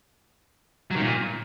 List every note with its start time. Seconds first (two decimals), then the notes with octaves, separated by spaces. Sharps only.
0.91 F#3
0.96 D#3
1.01 A#2